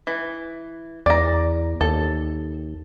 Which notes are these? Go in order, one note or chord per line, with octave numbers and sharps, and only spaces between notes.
E3
E2 D5 A#5
D#2 A4